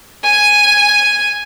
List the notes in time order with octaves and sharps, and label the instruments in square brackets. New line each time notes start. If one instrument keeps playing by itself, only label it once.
[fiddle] G#5